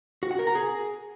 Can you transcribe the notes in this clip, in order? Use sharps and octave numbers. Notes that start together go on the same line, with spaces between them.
F#4
F#5
A#4
A#5
G#4